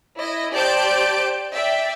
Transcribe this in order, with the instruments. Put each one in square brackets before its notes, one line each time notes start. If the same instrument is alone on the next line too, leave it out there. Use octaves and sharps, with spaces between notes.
[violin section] E4 D#5
G4 C5 D5 A5 G6 D7
D5 E5 G5